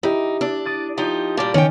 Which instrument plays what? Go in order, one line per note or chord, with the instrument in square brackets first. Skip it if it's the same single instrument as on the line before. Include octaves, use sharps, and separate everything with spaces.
[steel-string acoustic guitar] D#4 [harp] E4 G4
[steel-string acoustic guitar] D4 [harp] E6
[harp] D6 D#6 A6
[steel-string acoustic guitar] F3 D#4 G4
[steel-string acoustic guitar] A#2 G3 [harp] A5 D6
[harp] D#3 [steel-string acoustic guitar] C#4 G5